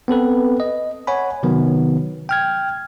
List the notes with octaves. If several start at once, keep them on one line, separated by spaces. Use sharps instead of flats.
B3 C4 A4 B4
D#5
C#5 F#5 G#5 B5
C3 D#3 F#3 B3
G5 F6 G#6